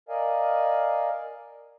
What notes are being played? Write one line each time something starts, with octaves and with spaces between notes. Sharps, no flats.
A#4 D5 D#5 F5 G#5